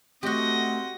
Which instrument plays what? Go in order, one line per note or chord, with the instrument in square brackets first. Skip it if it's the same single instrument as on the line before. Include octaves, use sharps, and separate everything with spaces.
[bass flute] A3 [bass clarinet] C4 [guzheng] F#4 G4 [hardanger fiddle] D#5 F#5